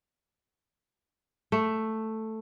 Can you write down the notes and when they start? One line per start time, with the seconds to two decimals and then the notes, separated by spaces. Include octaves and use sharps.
1.52 A3